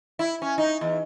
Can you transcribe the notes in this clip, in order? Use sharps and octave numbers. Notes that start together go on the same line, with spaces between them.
E4
C#4
D#4
E2